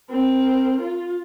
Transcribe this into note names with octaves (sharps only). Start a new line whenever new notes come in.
C4 A#4
F4